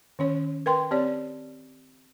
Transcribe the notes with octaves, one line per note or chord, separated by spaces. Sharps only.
D#3 C#4 C#5
A#4 B4 G5 C6
C4 G4 C#5 D5